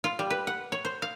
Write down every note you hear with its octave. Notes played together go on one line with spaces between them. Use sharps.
F4
G3
B4
F#5
C#5
C5
F5